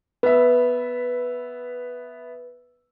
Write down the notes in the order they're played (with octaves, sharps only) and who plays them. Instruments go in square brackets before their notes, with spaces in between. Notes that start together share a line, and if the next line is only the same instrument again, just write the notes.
[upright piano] B3 E5 [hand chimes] B4